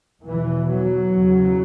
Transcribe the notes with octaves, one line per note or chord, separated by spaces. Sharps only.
E2 B2 E3
F#3
E2 C#3